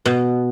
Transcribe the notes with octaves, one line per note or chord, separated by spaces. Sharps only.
B2